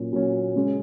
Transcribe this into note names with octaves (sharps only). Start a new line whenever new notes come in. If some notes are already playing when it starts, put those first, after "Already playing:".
Already playing: A#2 F#3 C#4
A#2 F#3 C#4
C#3 G#3 C#4